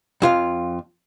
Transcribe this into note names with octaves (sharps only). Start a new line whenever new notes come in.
F2 F4 F5